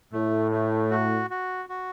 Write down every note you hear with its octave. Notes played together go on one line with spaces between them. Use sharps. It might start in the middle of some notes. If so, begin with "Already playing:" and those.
A2 A3
A3
F#4
F#4
F#4